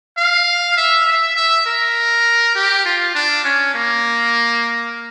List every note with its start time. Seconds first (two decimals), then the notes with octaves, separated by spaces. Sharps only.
0.18 F5
0.77 E5
1.06 E5
1.37 E5
1.66 A#4
2.55 G4
2.86 F4
3.15 D4
3.45 C#4
3.75 A#3